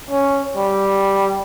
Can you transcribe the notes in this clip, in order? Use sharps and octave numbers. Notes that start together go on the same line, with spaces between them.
C#4
G3